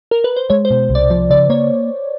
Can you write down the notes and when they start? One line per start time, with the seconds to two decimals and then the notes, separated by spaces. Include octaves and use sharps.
0.11 A#4
0.24 B4
0.36 C5
0.50 G#3 C#5
0.65 C5
0.70 B2
0.89 C2
0.95 D5
1.10 F3 D5
1.30 C#3 D5
1.50 A#3 C#5